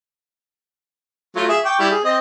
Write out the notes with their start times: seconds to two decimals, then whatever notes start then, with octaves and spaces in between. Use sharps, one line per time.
1.36 F#3 A3 F4
1.49 G#4 E5
1.65 G5 C#6 D6
1.79 G3 E4
1.91 G#4
2.04 C4 D#5